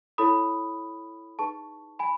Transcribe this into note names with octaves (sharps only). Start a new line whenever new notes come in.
E4 A4 C#5 B5 D#6
D#4 G#4 B4 A5 C#6
G#5 B5